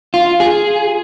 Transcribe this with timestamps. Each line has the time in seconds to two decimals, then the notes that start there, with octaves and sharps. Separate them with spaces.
0.14 F4
0.40 G#4